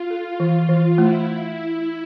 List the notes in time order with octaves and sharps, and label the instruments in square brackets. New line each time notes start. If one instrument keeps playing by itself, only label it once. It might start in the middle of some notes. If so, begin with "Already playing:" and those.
Already playing: [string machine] F4
[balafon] A4
E3
E3
[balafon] A3 [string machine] E4